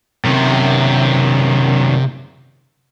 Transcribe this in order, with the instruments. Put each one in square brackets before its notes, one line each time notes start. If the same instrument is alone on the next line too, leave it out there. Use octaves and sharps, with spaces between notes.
[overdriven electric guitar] F#2 D#3 [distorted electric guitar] C3